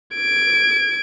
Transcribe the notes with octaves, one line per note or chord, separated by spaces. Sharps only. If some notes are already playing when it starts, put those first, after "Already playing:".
G#6 D7